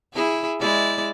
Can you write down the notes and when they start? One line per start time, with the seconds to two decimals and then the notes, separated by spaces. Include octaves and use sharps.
0.13 E4 G#4
0.60 G#3 E4 D5